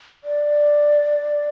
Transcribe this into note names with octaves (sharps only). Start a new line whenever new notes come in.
D5